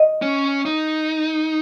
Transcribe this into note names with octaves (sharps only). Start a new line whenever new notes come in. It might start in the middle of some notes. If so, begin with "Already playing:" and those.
Already playing: D#5
C#4
D#4